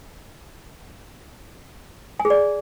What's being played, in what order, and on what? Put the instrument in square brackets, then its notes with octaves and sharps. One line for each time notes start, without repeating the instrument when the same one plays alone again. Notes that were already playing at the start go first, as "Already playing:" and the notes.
[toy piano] G#5
G#4
D5